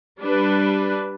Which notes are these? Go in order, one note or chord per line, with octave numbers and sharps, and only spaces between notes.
G3 D4 B4